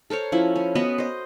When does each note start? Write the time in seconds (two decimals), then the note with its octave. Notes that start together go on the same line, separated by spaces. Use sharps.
0.10 A4 A#4 C5 C#5
0.32 F3 C#4 E4
0.56 C#4
0.75 B3 F#4 B4 D#5
0.98 C5 D#5